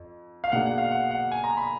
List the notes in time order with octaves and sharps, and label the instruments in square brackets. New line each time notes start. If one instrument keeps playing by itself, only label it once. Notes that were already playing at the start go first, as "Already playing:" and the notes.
Already playing: [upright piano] F2
[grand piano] F5
[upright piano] B2 A#3 D4 G#4 [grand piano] F#5
[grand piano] F#5
F5
F#5
F#5
G#5
A#5
B5